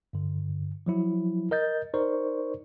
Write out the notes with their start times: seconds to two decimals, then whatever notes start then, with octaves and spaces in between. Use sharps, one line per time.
0.13 G2 D3
0.86 F3 F#3 E4
1.51 A#4 D#5 G6 A6
1.94 D#4 A#4 C5 D5 C#6